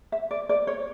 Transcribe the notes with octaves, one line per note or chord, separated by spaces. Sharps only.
E5
D5
D5
C#5